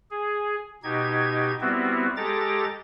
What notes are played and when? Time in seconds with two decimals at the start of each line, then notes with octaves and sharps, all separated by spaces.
0.11 G#4
0.83 B2 D#4 G4 G#6
1.61 G3 B3 C4 E4 F#4
2.17 G#3 G4 A4 A#5 D6 A6